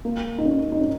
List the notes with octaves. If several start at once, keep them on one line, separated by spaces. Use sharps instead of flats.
A#3
D#4
C#4
D#4
C#4